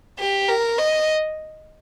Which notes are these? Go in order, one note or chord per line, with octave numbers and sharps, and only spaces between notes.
G4
A#4
D#5